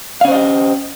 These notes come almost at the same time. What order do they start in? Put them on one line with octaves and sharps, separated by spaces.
F5 C#4 C5 D#5 G4